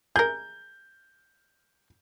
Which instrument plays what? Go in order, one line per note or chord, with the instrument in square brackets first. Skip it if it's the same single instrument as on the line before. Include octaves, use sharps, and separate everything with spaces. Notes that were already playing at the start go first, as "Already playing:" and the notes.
[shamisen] G#4 A#4 [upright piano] G6